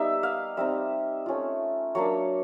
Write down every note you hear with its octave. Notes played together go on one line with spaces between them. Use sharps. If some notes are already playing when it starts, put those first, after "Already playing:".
Already playing: G3 B3 D#4 E5
F5
G3 C4 D#4 E5
A3 C#4 F4
F#3 A#3 D4 C#5